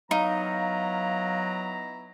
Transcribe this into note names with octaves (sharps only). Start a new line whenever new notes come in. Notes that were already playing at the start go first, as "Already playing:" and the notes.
F#3 B3 D#4 E4 F5 A#5